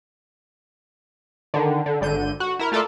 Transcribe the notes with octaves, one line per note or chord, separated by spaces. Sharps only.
D3 D#3
D3
G#1 D3 G6 D#7
F#4
E4 A#4
A3 F4 A4 A#4 D5